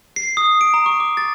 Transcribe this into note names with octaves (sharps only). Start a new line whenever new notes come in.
C7
D#6
D7
A#5
C#6
D6
A6